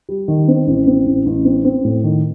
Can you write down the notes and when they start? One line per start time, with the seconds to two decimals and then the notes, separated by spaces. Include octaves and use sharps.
0.09 G3
0.28 D#3
0.48 C4
0.67 A1
0.87 C4
1.07 A1
1.26 A1
1.45 C4
1.65 C4
1.84 A2
2.04 D#3